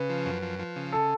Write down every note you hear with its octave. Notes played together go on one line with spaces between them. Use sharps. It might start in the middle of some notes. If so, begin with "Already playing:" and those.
Already playing: C#3 B4
F3
F#2
F3
F3
C#3
A4